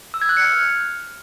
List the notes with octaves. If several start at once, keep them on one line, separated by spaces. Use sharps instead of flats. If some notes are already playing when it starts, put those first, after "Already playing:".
E6
G#6
F#6
C#7
F6